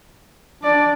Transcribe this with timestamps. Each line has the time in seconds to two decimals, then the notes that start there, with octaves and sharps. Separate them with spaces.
0.64 D4 D5